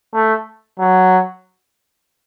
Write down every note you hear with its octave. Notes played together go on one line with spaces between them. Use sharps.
A3
F#3